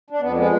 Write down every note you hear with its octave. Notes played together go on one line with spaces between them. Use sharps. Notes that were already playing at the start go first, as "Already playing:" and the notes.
D4
F2 B3
G#3 B3